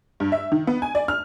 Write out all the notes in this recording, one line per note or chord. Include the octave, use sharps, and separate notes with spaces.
G2
E5
D#3
B3
G#5
D5
F6